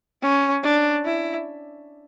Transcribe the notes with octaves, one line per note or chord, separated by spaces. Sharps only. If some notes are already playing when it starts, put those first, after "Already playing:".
C#4
D4
E4